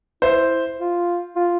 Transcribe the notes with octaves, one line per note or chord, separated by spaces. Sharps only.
E4 C5 E5
F4
F4